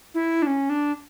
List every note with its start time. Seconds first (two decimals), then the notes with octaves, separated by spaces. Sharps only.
0.14 E4
0.42 D4
0.47 C#4
0.70 D4